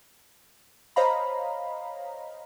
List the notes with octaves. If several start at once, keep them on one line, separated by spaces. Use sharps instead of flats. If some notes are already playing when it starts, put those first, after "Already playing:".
C5 C#5 D#5 F5 A#5 B5